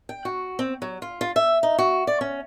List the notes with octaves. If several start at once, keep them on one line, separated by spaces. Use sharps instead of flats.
G5
F#4
C4
F#3
F4
F4
E5
D#4
F#4
D5
C#4